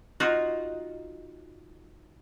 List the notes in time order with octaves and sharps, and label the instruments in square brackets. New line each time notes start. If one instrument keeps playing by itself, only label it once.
[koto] D#4 F4 F#4